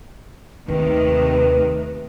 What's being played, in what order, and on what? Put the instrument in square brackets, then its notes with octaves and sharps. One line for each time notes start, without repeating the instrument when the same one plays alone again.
[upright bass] D#2 [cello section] C3 D#3 A3 [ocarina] B4